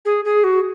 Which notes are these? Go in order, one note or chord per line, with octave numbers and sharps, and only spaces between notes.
G#4
G#4
F#4